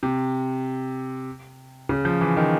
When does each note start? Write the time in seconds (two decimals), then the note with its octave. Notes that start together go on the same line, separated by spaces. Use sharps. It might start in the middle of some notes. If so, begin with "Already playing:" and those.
0.03 C3
1.89 C#3
2.05 F3
2.21 E3
2.37 D#3